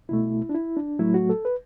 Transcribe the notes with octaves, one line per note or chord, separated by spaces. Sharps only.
C2 B2 A3 E4
D4
E4
D4
A2 F#3 A3 E4
F#4
A4
B4